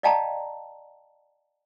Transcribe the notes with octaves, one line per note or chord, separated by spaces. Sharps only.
D5 D#5 F5 G5 A5 A#5